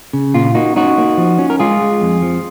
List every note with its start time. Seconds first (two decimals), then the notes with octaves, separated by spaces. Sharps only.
0.13 C#3
0.34 A#2 F4
0.55 A#3 D#4 F#4
0.76 C#4 D#4 F#4
0.98 A#3
1.17 F3
1.38 C#4
1.50 A#4
1.59 G#3 F4 G#4
1.81 G#3
2.02 F2
2.23 F3